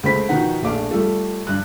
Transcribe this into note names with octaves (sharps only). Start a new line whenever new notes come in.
C#2 A3 C5 B5 B6
B2 D#3 F3 D#4 B4 F#5
A#1 A3 D4 F5 D6
G3 A3 F4 A4
G2 F#6